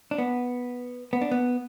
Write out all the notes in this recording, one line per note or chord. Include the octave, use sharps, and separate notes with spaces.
D4
B3
B3
D4
B3